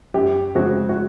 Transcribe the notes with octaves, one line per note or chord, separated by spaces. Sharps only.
F#2 G4
C#3 F3 G#3 C4 F#4
F#4